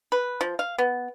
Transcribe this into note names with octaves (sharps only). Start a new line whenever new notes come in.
B4
F3
F5
B3